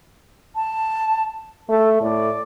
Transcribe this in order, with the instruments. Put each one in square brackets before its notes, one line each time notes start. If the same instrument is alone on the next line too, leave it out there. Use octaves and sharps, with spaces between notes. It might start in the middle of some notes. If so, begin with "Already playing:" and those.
[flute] A5
[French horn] A3 [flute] A4
[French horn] A2 [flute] D5